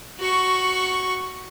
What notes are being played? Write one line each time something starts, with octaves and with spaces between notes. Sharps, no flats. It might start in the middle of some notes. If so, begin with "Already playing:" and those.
F#4 C#6